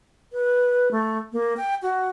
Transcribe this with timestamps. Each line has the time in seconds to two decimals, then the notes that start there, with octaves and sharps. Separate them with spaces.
0.32 B4
0.91 A3
1.33 A#3
1.57 G5
1.82 F#4